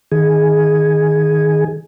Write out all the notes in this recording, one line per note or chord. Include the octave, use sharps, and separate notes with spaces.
D#3 G#4